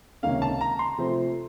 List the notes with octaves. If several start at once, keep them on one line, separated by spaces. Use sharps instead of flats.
C#2 C3 D#3 A#3 C#4 F5
A5
A#5
C6
C3 F3 A3 C4